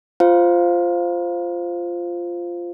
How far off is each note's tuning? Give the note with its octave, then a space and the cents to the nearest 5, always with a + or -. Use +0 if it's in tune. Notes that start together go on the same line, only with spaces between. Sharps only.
F4 -5 C5 +0 F5 +0